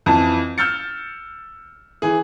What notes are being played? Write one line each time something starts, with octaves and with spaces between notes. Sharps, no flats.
F2 E3 A5
E6 F6 G6 A6 C#7
E3 G#4